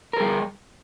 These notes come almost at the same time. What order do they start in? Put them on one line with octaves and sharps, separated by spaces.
A#4 G#4 G3